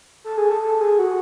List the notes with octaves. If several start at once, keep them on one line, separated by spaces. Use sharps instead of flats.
A4
G#4
A4
A4
G#4
F#4